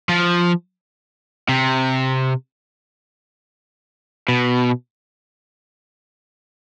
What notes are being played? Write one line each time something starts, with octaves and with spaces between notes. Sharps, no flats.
F3
C3
B2